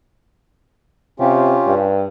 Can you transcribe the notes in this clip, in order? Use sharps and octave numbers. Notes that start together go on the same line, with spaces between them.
C3 C#4 F4 G4
G2